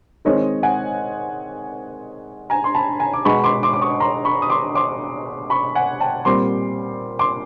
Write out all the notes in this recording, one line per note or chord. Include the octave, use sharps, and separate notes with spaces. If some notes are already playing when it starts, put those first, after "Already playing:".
D#3 G#3 C4 C#5 D#5
F#5 G#5
G#5 A#5
C6
A5 B5
G#5 A#5
D6
B2 G#3 B3 B5 C#6
C6 D6
C6 D6
D6
C#6 D#6
A#5 C6
B5 C#6
D#6
C6 D6
C6 D6
B5 C#6
F#5 G#5
G5 A5
A#2 G3 C4 C6 D6
C6 D6